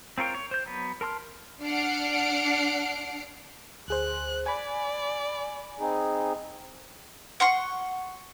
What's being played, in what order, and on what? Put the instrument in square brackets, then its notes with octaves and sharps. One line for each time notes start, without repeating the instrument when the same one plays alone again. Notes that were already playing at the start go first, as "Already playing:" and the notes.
[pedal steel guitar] C4 F4 A#4 C#5 G5
C#5
C5 G6
F#3 B3
A#4 A5 C6 F6
[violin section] D4 F#5 F6 C7 D7
[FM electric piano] D2 G#4 C5 [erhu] F#6
[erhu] D5 [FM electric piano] G#5 B5
[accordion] C4 D#4 G#4
[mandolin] F#5 C6 C#6